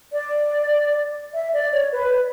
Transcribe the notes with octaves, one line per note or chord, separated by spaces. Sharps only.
D5
E5
D5
C#5
B4